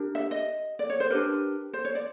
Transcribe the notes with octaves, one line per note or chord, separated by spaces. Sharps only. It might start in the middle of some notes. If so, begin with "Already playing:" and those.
Already playing: D4 G4 A#4
E5
D#5
D5
C#5
C5
D4 G4 A#4 B4
C5
C#5
D5